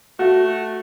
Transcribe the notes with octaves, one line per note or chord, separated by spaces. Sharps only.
A3 F#4